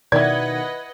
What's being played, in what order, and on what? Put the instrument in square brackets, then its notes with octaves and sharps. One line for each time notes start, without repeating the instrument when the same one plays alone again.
[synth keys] B2 D#3 [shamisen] E4 D5 [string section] B4 D#5 F#5 [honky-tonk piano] G#6